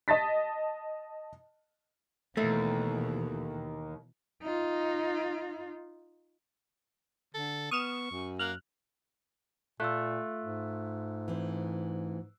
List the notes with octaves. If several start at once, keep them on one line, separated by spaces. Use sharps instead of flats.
D#5 A5 A6 B6
D#2 B2 E3 A3
D#4 F4
D3 A4
B3 C#6 D#6 F6 E7
F#2
A#3 F6 F#6
A#2 A3 F4 E6 F#6
G#2
E3 C4